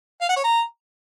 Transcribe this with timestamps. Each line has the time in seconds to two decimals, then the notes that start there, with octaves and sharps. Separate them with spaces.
0.21 F5
0.29 F#5
0.36 C#5
0.44 A#5